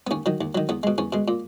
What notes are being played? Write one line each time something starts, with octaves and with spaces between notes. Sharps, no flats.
B3
D#2 C#4
D#3 F#3
D#2
D#3 F#3
E2 B3
B2 G#3
E2 C#4
B2 G#3
A#2